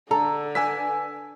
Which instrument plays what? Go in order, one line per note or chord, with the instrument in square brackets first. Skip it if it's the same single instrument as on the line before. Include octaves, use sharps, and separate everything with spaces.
[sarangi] D3 [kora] A4 [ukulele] A#5
[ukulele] B4 [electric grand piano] G#5 E6 B6